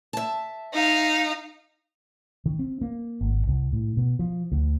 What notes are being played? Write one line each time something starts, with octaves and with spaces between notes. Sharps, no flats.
E5 A5
D#4 F5
D#3
C4
A#3
G#1
C2
A2
B2
F3
D2